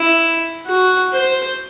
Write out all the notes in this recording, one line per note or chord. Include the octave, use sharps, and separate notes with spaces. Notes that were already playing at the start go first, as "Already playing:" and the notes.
Already playing: E4
F#4
C5